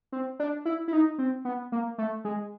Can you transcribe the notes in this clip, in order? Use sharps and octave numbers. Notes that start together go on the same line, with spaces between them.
C4
D4
E4
E4
D#4
C4
B3
A#3
A3
G#3